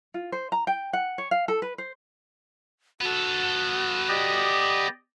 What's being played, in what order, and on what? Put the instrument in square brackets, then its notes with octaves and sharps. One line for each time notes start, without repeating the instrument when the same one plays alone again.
[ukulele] F4
C5
A#5
G5
F#5
C#5
F5
A4
B4
C5
[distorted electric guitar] B3 A4 [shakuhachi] F#4
[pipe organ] G4 D5 D#5